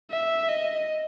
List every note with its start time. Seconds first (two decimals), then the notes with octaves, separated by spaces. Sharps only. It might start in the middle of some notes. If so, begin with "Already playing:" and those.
0.11 E5
0.49 D#5